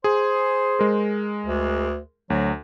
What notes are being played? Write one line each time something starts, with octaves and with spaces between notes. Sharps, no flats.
G#4 C5
G#3 A#4
D2
D2 F#3